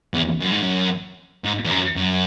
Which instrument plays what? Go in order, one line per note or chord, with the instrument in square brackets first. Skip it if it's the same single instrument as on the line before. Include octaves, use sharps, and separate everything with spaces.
[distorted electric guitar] E2
F#2
G#2
F#2
G#2
E2
F#2
F#2